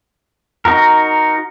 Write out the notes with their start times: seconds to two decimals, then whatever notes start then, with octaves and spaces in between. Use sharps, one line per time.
0.65 D#4 F#4 A#4